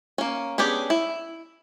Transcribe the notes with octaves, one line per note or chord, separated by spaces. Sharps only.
A#3 C#4
B3 C#4 D4 G4 G#4
E4